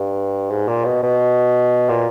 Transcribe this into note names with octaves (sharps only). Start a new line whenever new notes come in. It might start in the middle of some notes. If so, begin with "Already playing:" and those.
Already playing: G2
G#2
A#2
B2
B2
A#2